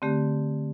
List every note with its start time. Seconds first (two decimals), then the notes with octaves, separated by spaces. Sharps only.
0.02 D3 A3 C4 G4